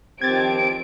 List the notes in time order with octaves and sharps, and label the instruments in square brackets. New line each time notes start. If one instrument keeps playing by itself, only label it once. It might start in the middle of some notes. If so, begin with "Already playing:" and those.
[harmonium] D#3 F3 G4 [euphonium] C4 [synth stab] G#6 A6 [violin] D7